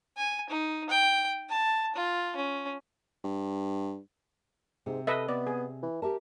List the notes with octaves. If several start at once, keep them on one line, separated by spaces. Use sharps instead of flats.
G#5
D#4
G5
A5
F4
C#4
G2
G#2 C3
A4 B4 D#5 E5
B3 D5
G#4
E3
G4 A#4 E5 A5